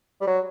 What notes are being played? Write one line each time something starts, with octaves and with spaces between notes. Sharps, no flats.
G3
F#3